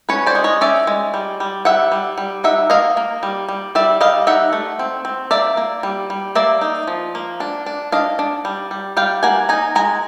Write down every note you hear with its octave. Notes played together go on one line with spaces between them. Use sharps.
C#4 B4 C#5
C5 D5
G#3
C#5 D#5
C#4 D5 E5
G#3
G3
G3
G3 E5 F#5
G3
G3
D#4 E5 F#5
A#3 D#5 F5
A#3
G3
G3
G3 D5 E5
G3 D#5 F5
D#4 E5 F#5
A3
C4
C4
A#3 D5 E5
A#3
G3
G3
A#3 D5 E5
D#4
F3
A#3
D4
D4
D4 D#5 F5
D4
G3
G3
G3 F5 G5
A#3 F#5 G#5
D#4 G#5 A#5
G#3 G#5 A#5